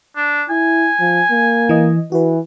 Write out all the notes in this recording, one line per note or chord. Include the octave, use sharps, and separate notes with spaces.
D4
E4 G#5
F3
A#3
E3 D#5
E3 F#4 B4